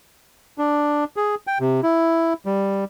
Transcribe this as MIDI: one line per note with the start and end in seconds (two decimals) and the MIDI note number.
0.58 1.04 62
1.16 1.35 68
1.47 1.58 79
1.60 1.81 48
1.83 2.33 64
2.46 2.84 55